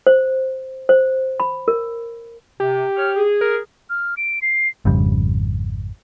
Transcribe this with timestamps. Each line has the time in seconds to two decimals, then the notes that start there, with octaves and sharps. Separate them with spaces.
0.07 C5
0.89 C5
1.40 B5
1.68 A#4
2.60 C3 G4
2.96 C#5 F6
3.16 G#4
3.41 A#4
3.90 F6
4.17 D7
4.42 C7
4.85 G#1 F2 C#3 G3